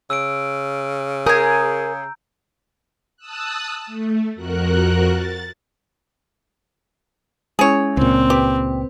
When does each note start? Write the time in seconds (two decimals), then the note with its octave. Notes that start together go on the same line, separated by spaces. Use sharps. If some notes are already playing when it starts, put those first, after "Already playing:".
0.10 C#3 E6 D7
1.26 G#4 A#4 G#5 A#5 G6
3.17 A5 D#6 E6 F#6
3.86 A3
4.35 F2 F#4 A#4 F#6
5.10 A6
7.59 G#3 C#4 E4 G#4 C#5
7.97 C#2 A#2 C4
8.30 G4 B4